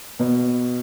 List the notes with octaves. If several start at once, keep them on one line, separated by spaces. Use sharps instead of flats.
B2